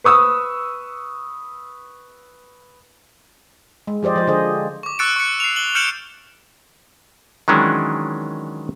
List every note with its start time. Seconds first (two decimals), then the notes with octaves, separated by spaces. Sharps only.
0.04 B4 C#6 D#6 E6
3.87 G#3
4.03 F3 G4 C5 D5 D#5
4.16 F3 C5
4.27 D3 G#4 C5 D#5
4.83 C#6 D6
4.99 C#6 E6 F#6 A6 C#7 D7
5.16 C#6 C#7
5.40 C7 F7
5.56 F#7 G7
5.75 F6 G6 C#7 D7 E7 F#7
7.48 D#3 E3 F#3 G#3 C#4 D4